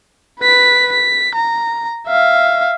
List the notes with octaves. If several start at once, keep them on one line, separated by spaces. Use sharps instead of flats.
B4 B6
B6
A#5
E5 F5